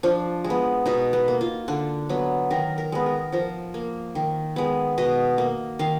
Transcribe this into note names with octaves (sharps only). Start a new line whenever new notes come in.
F3 D4
G#3
B3
B2 D#4
B3
A#3
F4
D3 D4
F#3 B3
D#3 A#4
A#4
G#3 B3
A#4
F3 A#4
A#3
D#3
G#3 B3
B2 D#5
A#3
D#3 F5